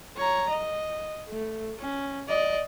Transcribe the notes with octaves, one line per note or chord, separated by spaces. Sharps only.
C#5 A#5
D#5
A3
C#4
D5 D#5